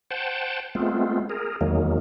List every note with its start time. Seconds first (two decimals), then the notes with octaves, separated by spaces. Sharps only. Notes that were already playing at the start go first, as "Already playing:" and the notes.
0.11 C5 F#5 G5 A5
0.75 G#3 A3 B3 C4 F4
1.30 G#4 A#4
1.61 E2 D#3 F#3 G#3 A#3